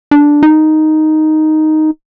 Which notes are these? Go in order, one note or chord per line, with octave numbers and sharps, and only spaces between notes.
D4
D#4